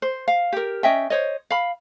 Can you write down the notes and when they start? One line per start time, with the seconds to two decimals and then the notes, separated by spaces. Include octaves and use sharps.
0.02 C5
0.28 F5
0.53 G4 A#4
0.83 C#4 D#5 E5 G5
1.10 C5 C#5 D#5
1.50 F5 B5